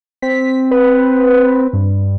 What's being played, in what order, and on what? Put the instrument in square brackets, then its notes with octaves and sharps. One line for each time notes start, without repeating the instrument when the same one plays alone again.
[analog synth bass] C4 [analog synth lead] B6
[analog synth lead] B4
G2